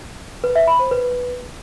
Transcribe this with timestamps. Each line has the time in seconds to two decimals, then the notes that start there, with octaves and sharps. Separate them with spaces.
0.44 B4
0.56 E5
0.67 B5
0.79 C5
0.91 B4